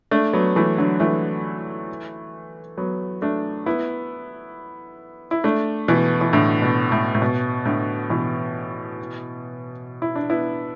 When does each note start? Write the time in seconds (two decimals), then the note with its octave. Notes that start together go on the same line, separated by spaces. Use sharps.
0.11 A3 D4
0.33 F#3 B3
0.56 E3 A3
0.78 D3 F#3
1.00 E3 A3
2.77 F#3 B3
3.22 A3 D4
3.66 B3 E4
5.31 E4
5.44 A3 D4
5.88 B2 E3
6.21 E3
6.33 A2 D3
6.62 B2
6.92 A2
7.15 A2
7.22 B2
7.65 A2 D3
8.10 B2 E3
10.02 E4
10.16 D4
10.30 B3 E4